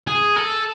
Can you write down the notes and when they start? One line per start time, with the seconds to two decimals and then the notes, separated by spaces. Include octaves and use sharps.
0.07 G#4
0.36 A4